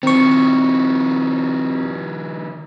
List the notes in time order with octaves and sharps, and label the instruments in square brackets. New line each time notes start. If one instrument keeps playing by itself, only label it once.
[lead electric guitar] D#3 F3 [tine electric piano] C4 C#6